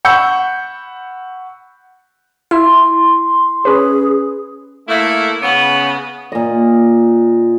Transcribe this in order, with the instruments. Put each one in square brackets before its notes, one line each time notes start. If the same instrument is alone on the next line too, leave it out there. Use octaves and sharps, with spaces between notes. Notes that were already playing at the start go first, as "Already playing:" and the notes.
[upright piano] F#5 B5 C#6 E6 G6 C#7
[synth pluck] E4 [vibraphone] C6
[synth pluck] C#4 B4 [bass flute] G#4
[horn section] A3 A#3 E4
C#3 B3
[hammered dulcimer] A#2 D#5